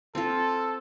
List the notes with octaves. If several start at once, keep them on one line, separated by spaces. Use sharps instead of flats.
C4 F4 A4